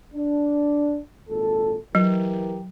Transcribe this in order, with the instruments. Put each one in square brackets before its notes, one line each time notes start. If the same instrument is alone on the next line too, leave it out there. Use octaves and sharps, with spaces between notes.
[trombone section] D4
G#1 A#2 A4
[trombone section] E3 G4 A#4 [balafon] F#3